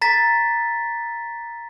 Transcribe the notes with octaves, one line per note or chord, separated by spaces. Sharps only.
A#5 A6 B6